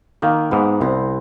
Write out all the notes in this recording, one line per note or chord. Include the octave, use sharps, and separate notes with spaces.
D#3 A#3
G#2 B3
C2 C4